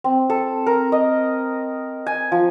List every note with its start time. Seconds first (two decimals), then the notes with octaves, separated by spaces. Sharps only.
0.04 C4
0.30 A4
0.66 A#4
0.92 D#5
2.07 G#5
2.32 F3